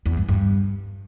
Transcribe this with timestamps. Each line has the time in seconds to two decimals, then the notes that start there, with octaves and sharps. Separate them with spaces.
0.06 E2
0.17 G2
0.28 G2